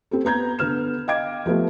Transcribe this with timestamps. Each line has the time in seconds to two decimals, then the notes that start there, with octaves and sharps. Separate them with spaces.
0.11 C4 G4 A4
0.25 B3 A#5 G6 G#6
0.59 D3 B3 F6 E7
1.08 D#5 F5 G5 D6 G#6 D7
1.46 F3 A3 B3 G4